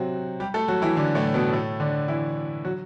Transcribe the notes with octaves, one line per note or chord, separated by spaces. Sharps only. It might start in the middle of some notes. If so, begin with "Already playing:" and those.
Already playing: C3 F#3 C4 F#4
G3 G4
A3 A4
F#3 F#4
E3 E4
D3 D4
A2 A3
B2 B3
A2 A3
D3 D4
E3 E4
F#3 F#4